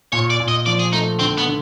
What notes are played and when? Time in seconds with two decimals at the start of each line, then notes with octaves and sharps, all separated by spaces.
0.12 A#2 C#5
0.30 D5
0.40 A#2
0.48 D#5
0.66 F3 D5
0.79 G#4
0.93 A3 D#4
1.19 D3 C4
1.38 B3
1.46 D3